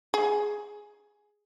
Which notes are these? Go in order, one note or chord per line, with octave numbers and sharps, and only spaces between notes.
G#4